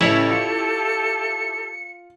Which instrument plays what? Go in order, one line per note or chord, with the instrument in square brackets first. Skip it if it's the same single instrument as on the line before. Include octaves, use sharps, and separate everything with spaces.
[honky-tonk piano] A1 C#3 F#7 [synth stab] E4 C#5 [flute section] G4 A4
[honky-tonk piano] F4 [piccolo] C#7